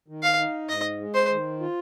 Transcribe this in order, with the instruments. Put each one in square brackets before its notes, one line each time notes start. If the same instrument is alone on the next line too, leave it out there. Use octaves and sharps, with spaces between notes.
[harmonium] D#3
[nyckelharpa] F5
[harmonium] D#4
[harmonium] G#2 [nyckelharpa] D#5
[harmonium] G#3
[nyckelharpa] C5
[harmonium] D#3
F4